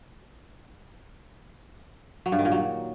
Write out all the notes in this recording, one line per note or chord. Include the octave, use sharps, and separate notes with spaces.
F#3
G2
D#3
A#2
F#3